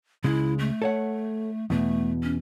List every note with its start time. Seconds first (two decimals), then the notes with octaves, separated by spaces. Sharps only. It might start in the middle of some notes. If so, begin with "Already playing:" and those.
0.24 C#2 C#3 G#3 E4
0.59 A3
0.82 A4 C#5 F#5
1.70 E2 B2 A3
2.23 C#4